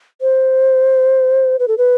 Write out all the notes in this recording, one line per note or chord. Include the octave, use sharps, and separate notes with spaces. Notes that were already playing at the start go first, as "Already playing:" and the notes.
C5
B4
A4
B4